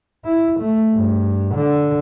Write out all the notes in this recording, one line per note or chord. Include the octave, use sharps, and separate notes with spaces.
E4
A3
G2
D3